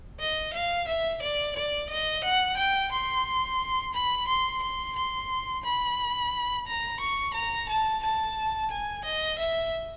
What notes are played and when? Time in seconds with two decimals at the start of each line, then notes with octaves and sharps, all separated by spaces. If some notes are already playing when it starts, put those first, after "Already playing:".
0.20 D#5
0.53 F5
0.88 E5
1.22 D5
1.56 D5
1.90 D#5
2.24 F#5
2.58 G5
2.92 C6
3.94 B5
4.28 C6
4.63 C6
4.97 C6
5.64 B5
6.67 A#5
7.00 C#6
7.34 A#5
7.69 A5
8.03 A5
8.71 G#5
9.05 D#5
9.39 E5